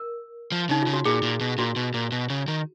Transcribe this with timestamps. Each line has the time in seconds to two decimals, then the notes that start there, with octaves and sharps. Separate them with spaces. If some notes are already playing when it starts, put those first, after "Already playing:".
Already playing: A#4
0.52 F3
0.69 C#3 D#4
0.83 C#3 F4
0.93 F#4
1.05 A#2 G#4
1.22 A#2
1.41 B2
1.58 A#2 F#4
1.76 B2
1.94 A#2
2.12 B2
2.30 C#3
2.48 D#3